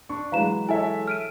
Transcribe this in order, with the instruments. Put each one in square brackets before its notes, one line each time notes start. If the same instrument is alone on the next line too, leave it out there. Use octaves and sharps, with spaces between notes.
[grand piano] D4 [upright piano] C#6
[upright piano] E3 F#3 G#3 [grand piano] B4 [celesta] F5 A#5 E7
[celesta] E4 G#5 [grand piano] A4 C#5 E5
[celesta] F6 D7 D#7